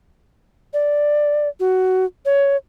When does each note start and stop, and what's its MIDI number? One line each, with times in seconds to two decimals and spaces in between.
0.73 1.48 74
1.60 2.05 66
2.25 2.56 73